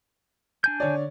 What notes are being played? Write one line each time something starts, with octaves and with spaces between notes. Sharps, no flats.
D4 G#5 G6
D3 C#5 D5